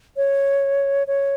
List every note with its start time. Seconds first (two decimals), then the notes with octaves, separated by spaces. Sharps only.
0.17 C#5
1.07 C#5